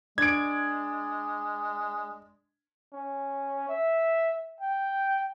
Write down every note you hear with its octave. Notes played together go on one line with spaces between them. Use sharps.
G#3 D4 G#6 D7
C#4
E5
G5